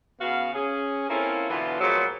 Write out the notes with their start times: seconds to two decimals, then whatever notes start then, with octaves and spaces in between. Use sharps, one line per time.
0.21 C#3 B3 F#4 F5
0.54 C#4 G#4
1.09 A#3 C4 C#4 E4 F4 A4
1.49 B2 D3 E3 B3 F4
1.80 A#2 F3 F#3 G#3 A#3 B3